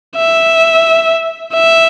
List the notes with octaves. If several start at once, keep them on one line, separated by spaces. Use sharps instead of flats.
E5
E5